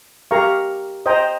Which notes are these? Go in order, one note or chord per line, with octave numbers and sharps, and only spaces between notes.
G4 A#4 F5 A#5 C#6
C5 D#5 G5 A#5